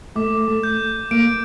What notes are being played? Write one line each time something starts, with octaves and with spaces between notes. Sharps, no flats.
A3 D6
A3
G6
A#3 D7